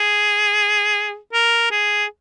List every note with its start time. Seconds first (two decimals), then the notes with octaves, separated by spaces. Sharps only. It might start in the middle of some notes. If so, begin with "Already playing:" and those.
Already playing: G#4
1.33 A#4
1.71 G#4